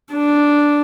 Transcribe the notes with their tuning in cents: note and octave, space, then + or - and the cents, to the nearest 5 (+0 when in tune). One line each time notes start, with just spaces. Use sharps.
D4 -5